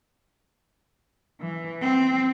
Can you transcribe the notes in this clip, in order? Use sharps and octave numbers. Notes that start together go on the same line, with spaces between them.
E3
C4